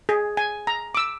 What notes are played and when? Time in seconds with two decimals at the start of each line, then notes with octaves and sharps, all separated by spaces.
0.09 G#4
0.37 G#5
0.67 A#5
0.95 D6 E6